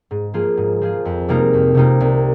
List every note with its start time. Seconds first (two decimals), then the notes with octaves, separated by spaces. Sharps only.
0.11 G#2
0.34 F3 A#3 F4 G#4
0.57 G#2
0.81 F3 A#3 F4 G#4
1.05 F2
1.28 C3 G3 A#3 D#4
1.53 F2
1.75 C3 G3 A#3 D#4
2.00 C2